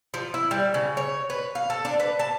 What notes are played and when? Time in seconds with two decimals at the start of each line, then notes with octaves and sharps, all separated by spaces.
0.14 F3
0.34 E4
0.51 G3
0.74 C#3
0.97 C#5
1.30 B4
1.55 F5
1.70 A4
1.85 D4
2.00 B4
2.19 A5